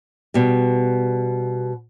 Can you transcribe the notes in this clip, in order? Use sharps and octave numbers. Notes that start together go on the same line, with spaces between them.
B2 G3